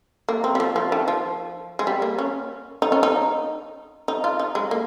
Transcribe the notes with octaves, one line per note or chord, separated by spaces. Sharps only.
A#3
C4
G3
F3
F3
D#3
F3
G#3
G3
A#3
C#4
D#4
C#4
D#4
D#4
F4
D#4
G#3
A#3